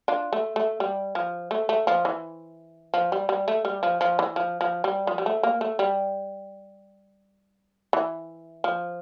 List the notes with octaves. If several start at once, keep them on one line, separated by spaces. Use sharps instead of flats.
D4 F4
A3
A3
G3
F3
A3
A3
F3
E3
F3
G3
G3
A3
G3
F3
F3
E3
F3
F3
G3
F3
G3
A3
A#3
A3
G3
E3
F3